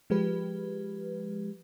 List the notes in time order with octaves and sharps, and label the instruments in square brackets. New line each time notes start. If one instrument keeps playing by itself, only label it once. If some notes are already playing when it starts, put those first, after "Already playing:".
[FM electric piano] F3 G#3 G4 B4